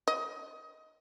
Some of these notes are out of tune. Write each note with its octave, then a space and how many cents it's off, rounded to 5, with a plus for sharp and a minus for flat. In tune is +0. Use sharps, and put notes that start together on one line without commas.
D#5 +20